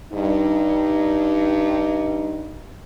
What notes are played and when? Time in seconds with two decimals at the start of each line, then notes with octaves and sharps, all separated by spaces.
0.12 G2 D#4